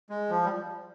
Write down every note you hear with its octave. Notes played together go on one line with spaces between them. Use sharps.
G#3
F3
G3